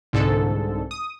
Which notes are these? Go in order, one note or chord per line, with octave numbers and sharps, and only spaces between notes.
C2 G#2 D3 A4
D#6